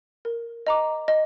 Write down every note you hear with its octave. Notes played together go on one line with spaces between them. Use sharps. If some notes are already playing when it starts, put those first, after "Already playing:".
A#4
D#5 A#5 D6
D#5